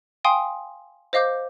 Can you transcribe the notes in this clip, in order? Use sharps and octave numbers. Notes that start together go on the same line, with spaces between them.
F5 G5 G#5 C6 D#6
C5 D#5 F5 D6 G6